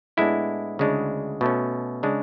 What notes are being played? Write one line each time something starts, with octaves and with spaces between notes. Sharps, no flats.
A2 G#3 B3 D4 E4
D2 C#3 G#3 D4
B2 A3 C#4
C#3 G#3 D4